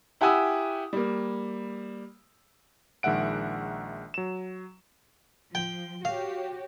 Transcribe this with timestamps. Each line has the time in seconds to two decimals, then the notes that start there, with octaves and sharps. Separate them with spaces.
0.21 E4 G4 F#5 G#5 D#6 E6
0.93 G3 A#3
3.03 A#1 D#3 G#3 E5 F#5 D7
4.14 F#3 E7
5.55 F3 G5
6.05 F#4 G4 C#5 F5